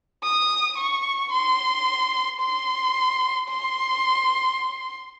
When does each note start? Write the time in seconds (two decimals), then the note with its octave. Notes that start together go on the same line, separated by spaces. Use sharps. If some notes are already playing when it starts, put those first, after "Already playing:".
0.24 D#6
0.78 C#6
1.32 C6
2.40 C6
3.49 C6